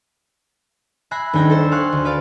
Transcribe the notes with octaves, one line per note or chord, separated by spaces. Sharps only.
E5 G#5 B5 F#6 A#6 C7
D#1 D#2 D4 G5 G#6 A#6
A4 C5 E6
F5 G#5 C6 C#6 F#6
D2
B4 D5 F5 A6